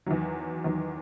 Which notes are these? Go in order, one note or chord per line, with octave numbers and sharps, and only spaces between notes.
E2 D#3 F#3
E2 D#3 F#3